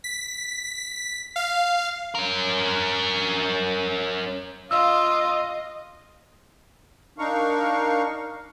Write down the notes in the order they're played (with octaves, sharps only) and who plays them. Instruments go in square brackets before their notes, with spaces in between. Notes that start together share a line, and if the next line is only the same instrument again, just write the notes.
[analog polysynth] B6
F5
[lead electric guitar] C#4 A#4
[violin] F4 [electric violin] D#5 [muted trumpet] F5 [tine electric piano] E6
[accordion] D4 D#4 A#4 F5 C#6